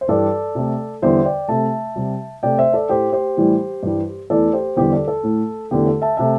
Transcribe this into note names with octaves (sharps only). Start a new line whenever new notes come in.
C5
G2 E3 G3 A4 D5
C3 A3
E2 D3 G3 C5 E5
D5 G5
C3 A3 E5 A5
C3 G3
C3 A3 D5 G5
C5 E5
A4 D5
A2 A3 G4 C5
G4 C5
A2 E3 G3
G2 E3 G3
E2 E3 A3 A4 D5
G4 C5
E2 D3 G3 G4 C5
A4 D5
A4
A2 A3
E2 D3 A3 G4
A4
E5 A5
C3 A3 E5 A5